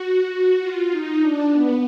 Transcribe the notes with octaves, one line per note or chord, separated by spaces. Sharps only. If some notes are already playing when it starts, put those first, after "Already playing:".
Already playing: F#4
F4
D#4
D4
B3